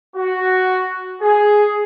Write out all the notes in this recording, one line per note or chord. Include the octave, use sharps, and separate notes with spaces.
F#4
G#4